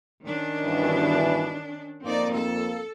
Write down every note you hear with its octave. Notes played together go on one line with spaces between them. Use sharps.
D#3 C#4 D4
G2 B2 E3
F2 A#3 C4 D#4 D5
A4